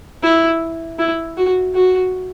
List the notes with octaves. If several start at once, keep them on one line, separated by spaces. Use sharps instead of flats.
E4
E4
F#4
F#4